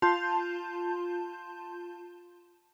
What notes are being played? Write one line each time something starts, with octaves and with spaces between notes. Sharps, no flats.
F4 A5 C6 G6